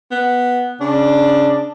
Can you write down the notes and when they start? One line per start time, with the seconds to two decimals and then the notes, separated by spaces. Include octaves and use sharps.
0.11 B3
0.81 C#3 D4